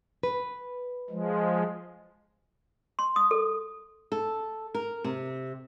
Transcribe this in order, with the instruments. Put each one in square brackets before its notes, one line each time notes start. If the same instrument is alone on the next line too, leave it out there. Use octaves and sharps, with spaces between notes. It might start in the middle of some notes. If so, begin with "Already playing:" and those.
[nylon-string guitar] B4
[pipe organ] F3 G#3
[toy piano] C6
D#6
A4
[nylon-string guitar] A4
A#4
C3